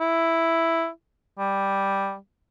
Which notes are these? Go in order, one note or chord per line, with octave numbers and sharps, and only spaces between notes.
E4
G3